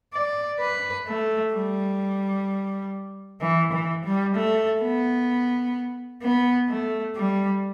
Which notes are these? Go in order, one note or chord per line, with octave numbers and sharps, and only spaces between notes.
D5
B4
A3
G3
E3
E3
G3
A3
B3
B3
A3
G3